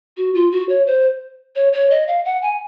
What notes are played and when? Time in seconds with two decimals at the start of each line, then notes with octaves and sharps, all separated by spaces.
0.17 F#4
0.35 F4
0.52 F#4
0.69 C#5
0.86 C5
1.56 C#5
1.73 C#5
1.91 D#5
2.08 F5
2.25 F#5
2.42 G#5